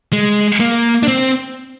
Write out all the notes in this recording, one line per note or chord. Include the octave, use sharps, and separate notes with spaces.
G#3
A#3
D4
C4